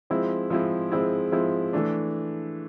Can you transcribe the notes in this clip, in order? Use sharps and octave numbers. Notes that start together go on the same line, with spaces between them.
F3 G#3 C4 E4
F3 G#3 C4 E4
F3 G#3 C4 E4
F3 G#3 C4 E4
E3 A3 D4